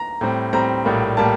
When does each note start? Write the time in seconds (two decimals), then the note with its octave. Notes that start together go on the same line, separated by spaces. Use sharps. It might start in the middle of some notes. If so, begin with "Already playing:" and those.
Already playing: A#5
0.21 A2 G3 C4
0.53 A2 G3 C4 A#5
0.85 A#1 A2 G3 A#3
1.17 A2 G3 A#3 A5